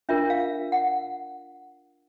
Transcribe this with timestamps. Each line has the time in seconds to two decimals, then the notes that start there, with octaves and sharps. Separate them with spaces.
0.09 D4 F4 A#4 E5
0.30 F5
0.72 F#5